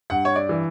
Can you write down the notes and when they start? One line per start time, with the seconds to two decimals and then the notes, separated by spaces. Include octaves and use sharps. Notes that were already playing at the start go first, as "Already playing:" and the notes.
0.10 G2 F#5
0.25 C#5
0.36 D5
0.49 E3